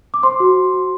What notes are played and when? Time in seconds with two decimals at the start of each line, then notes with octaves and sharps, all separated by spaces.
0.14 D6
0.23 C5 C6
0.40 F#4
0.57 F#4
0.74 F#4